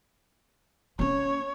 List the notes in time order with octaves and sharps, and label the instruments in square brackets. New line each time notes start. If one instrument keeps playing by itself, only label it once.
[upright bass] A#3 C#4 [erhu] C#5